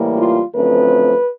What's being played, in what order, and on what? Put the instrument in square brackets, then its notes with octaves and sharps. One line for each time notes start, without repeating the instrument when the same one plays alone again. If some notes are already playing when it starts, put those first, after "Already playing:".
Already playing: [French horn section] A2 E3 G3 A#3
F4
F#2 D3 F3 A3 C4 B4